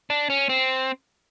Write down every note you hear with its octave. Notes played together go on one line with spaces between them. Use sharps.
D4
C#4
C4